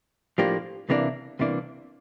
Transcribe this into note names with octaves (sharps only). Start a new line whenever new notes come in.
A2 F3 A#3 D4 G4
C2 C3 E3 A#3 D4
C2 C3 E3 A#3 D4